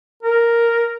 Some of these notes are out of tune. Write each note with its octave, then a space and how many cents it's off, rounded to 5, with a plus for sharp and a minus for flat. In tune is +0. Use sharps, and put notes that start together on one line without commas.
A#4 +0